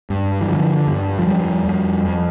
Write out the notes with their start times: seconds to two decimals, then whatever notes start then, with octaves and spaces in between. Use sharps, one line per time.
0.10 G2
0.41 E3
0.48 D3 F3
0.87 G2
1.19 F3
1.27 F2 G3
1.66 F2
2.05 F2